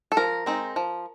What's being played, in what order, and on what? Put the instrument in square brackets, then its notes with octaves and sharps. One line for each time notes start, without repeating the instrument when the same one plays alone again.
[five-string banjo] A4
F3 A#4
G#3 C4 D#4
F3